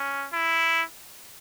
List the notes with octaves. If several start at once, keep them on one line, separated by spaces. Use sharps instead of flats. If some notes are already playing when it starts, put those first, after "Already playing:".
Already playing: C#4
E4